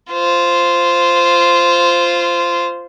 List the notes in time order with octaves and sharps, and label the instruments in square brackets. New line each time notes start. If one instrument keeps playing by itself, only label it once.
[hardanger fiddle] F4 C5